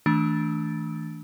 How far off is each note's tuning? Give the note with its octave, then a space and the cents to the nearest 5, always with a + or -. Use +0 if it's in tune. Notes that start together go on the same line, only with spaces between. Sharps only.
E3 -40 A3 +0 D4 -5